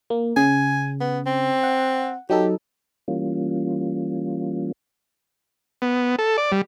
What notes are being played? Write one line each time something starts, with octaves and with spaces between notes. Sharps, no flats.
A#3
C#3 G#5
B3
C4
F#5
F#3 D#4 G4 A4
E3 G3 A#3 C#4 F4
B3
A4
D5
G3